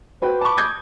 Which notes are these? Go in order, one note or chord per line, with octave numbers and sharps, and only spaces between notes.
F#4 B4 C5 G5
A5 B5 C#6 D6
D#6 G6 G#6